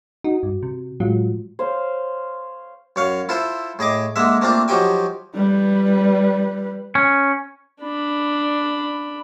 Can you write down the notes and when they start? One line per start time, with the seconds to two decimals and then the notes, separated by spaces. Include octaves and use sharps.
0.24 D#4 F#4
0.43 G2
0.63 C3
1.00 A2 F#3 G#3 F4
1.59 C5 C#5 F5
2.96 F#2 C#5 F5
3.29 E4 F4 A4 C5
3.79 A2 G#4 D#5 D6
4.16 D3 G#3 A#3 E5
4.41 A3 A#3 C4 D4 F4
4.68 F3 F#3 D#4 G4 G5 G#5
5.35 G3 B4
6.95 C#4
7.81 D4 B5